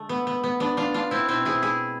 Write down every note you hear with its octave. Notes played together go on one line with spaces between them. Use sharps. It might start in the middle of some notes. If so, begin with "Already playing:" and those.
Already playing: D3 G#3 A3
B3
B3
B3
B3 D4
D4 F4
D4 F4
C4 E4
B2 A3 C4 E4
E4 G#4
E4 G#4